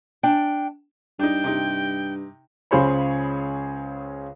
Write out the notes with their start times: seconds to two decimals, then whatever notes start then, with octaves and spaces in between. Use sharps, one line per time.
0.23 D4 G5
1.19 G2 D4 D#4 G5
1.44 C3 D#4
2.71 C#2 C#3 G#4 C5 C#5 B5